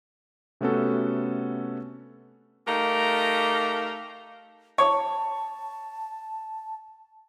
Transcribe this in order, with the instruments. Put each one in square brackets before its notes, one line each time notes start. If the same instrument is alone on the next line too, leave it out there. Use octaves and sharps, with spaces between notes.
[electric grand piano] C3 A3 B3 C#4 F#4 A4
[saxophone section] A3 D#4 G4 A#4 F5
[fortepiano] C#5 [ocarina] A5